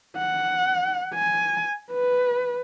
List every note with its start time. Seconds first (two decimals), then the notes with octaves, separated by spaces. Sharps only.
0.17 F#5
1.15 G#5
1.92 B4